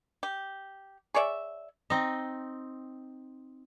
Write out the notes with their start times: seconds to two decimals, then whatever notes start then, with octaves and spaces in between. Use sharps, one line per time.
0.23 G4
1.14 G#4 C#5 D5 E5
1.90 C4 D#4